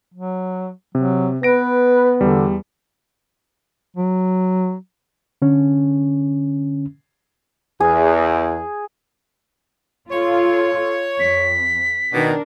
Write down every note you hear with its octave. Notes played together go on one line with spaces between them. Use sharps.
F#3
C3 F#3
B3 B4 A#6 D7
E2 D3 G3
F#3
D3 C#4
E2 G#4
F4 A4 C#5
F2 B6
B2 D#3 D4 A#4